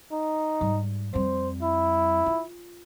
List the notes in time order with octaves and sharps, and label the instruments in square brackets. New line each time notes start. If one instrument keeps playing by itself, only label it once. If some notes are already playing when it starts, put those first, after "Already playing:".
[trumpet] D#4
[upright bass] G#2 G3
[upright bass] F2 G3 [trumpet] C5
[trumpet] E4
[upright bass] F4